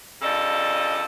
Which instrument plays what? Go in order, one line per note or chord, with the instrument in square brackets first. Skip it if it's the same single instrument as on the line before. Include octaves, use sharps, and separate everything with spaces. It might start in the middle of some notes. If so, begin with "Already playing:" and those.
[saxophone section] G2 C#3 F3 A4 D5 D#5